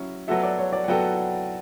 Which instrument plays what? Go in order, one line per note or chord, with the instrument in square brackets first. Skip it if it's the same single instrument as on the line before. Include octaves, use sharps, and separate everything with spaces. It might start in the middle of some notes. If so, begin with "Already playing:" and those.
Already playing: [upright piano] F#3 C#4 E4
[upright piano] F#3 B3 F#4 A4 [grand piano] E5
[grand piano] D5
C#5
D5
F#5
[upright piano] F#3 B3 F#4 A4 [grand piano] G5